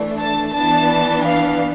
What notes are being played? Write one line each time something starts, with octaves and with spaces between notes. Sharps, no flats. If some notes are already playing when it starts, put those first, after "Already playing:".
Already playing: E3 A3 D4
A5
E3 B3 D4 A5
F5